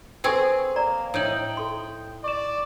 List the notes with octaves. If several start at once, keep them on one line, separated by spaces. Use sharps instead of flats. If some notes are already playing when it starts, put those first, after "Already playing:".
C4 G#4 A4 B4 C5 G5 C#6 E6
A#3 D5 A#5
A2 D#4 G5 D#6 G6 F#7
A4 C6
D5 C#6 E7